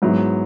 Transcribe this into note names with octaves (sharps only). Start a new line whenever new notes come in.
G#2 F#3 B3 E4